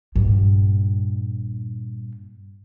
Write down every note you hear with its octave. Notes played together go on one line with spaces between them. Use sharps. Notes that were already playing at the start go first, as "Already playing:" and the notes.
G2 A#2